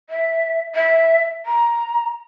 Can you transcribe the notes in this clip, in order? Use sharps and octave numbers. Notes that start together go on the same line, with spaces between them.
E5
E5
A#5